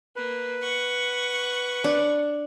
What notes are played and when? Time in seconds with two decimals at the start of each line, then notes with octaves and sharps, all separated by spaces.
0.16 A#3 B4
0.62 F#5 C#6
1.84 D4